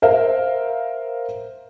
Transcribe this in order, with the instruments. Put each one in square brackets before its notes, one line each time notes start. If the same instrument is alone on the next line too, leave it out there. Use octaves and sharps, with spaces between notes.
[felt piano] A#4 C5 E5 F5